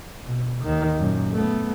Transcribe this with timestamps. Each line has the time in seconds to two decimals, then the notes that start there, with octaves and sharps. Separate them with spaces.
0.24 B2
0.64 D#2 D#3
0.98 F#2 A#2
1.33 A3 B3